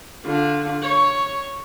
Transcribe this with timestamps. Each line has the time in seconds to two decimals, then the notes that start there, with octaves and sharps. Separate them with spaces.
0.25 D3 F4
0.82 C#5